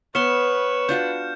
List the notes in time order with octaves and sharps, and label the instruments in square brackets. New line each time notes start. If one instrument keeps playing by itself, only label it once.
[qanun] B3 C6 [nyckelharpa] B4 [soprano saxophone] C#5 [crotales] F6 C#7 E7
[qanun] D4 F4 F#4 [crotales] G6